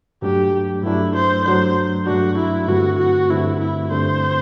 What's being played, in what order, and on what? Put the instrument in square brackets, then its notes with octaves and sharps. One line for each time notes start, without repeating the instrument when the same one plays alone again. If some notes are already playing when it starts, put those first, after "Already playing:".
[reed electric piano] G2 F#3 A3 D4 [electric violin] G4
[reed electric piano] G2 F#3 A3 D4 [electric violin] E4
[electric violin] C5
[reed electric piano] G2 F#3 A3 D4 [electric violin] C5
[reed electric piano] G2 F#3 A3 D4 [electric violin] F#4
[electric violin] E4
[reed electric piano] G2 D3 A3 C4 [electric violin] F#4
[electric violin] F#4
[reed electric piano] G2 D3 A3 C4 [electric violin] E4
[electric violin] E4
[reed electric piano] G2 D3 A3 C4 [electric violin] C5